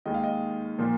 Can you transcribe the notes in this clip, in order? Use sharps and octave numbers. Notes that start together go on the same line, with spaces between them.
D#2 D#3 G#3 D#5
F5
D#5
A#2 F3 A#3